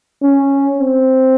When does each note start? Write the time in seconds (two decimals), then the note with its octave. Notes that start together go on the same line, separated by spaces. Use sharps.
0.23 C#4
0.79 C4